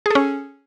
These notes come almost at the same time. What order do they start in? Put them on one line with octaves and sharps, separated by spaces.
G#4 A4 C#4